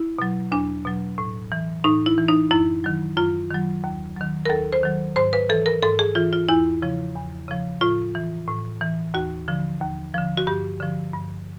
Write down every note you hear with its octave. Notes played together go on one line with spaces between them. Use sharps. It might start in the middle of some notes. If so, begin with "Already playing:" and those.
Already playing: E4
B2 F#3
E2 D4
B2 F#3
A2
E3
A2 D#4
E4
E3
D#4
F#2 E4
D#3 F#3
F#2 F4
D#3 F#3
D#2
D#3 F#3
A#4
D#2 A4
C5
D#3 F#3
G#2 C5
B4
E3 A4
A#4
G#2 A4
G#4
E3 F4
F4
E2 E4
C#3 F3
E2
C#3 F3
A2 F4
E3
A2
E3
D#2 F#4
D3 F3
D#2
D3 F3
F#4
G2 G4
D3 F3
G2